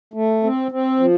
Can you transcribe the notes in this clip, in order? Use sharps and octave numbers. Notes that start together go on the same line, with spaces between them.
A3
C4
C4
F3